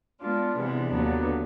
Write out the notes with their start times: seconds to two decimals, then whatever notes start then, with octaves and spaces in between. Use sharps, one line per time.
0.22 G#3 B3 D4 F4
0.56 C3 E3 G#3 B3 D4
0.92 D#2 D3 F#3 B3